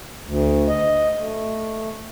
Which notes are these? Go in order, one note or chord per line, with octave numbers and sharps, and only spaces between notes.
D2
D#5
A3